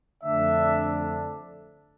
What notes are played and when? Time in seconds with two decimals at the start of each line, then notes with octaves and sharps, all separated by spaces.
0.24 F2 D3 A3 D4 E5